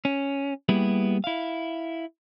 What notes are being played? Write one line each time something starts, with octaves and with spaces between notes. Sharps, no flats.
C#4
G3 A#3 B3 E4 G4 G#4
E4 F5